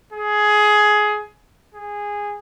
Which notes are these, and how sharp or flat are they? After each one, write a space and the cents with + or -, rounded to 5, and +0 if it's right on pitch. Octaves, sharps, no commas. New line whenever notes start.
G#4 +15
G#4 -10